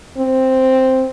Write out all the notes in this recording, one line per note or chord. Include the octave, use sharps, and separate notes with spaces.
C4